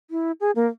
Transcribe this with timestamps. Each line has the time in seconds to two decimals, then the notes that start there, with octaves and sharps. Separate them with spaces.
0.11 E4
0.41 G#4
0.56 A#3